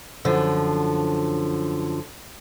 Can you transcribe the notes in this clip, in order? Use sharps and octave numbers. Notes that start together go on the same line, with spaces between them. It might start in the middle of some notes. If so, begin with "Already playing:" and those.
F#2 D3 F3